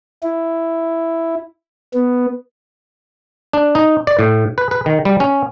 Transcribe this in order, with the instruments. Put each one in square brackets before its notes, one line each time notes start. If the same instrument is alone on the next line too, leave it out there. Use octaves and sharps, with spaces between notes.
[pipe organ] E4
B3
[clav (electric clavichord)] D4
D#4
D5
A2
B4
B4
D#3
G3
C#4